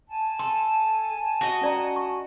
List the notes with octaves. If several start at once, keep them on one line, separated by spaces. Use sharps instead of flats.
G#5 A5
A4 C6
F#4 D#5
C#4 D5 A#5
C#6